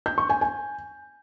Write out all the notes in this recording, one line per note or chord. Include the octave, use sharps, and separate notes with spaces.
G6
C#6
G#5
G#5